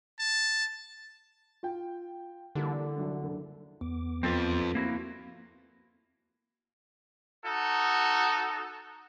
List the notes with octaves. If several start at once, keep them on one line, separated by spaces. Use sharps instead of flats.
A5
F4 G5
D3 E3 G3 A#3
C2 F#3 D4
F#1 D4
E2 B3 D6
F2 F3 C4 A4 B4
A#3 C4 E4 F#4
D#4 F#4 A4